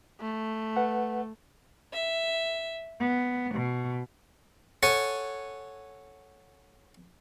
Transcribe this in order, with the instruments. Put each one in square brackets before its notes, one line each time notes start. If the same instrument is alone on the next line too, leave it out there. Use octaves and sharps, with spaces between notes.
[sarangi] A3
[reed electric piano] B4 F#5
[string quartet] E5
B3
B2
[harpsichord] A4 C#5 F#5 G#5